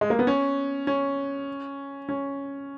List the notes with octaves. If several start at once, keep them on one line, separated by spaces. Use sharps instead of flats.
G#3
A#3
B3
C#4
C#4
C#4